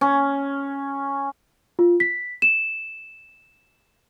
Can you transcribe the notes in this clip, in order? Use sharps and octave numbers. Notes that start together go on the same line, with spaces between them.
C#4
F4
B6
E7